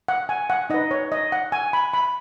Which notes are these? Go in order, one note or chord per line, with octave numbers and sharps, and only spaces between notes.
F#5
G#5
F#5
D#4 B4 D#5
C#5
D#5
F#5
G#5
B5
B5